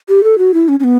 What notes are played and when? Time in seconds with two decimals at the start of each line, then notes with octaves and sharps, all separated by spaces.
0.09 G4
0.24 A4
0.38 F#4
0.54 E4
0.68 C#4
0.80 C#4
0.84 B3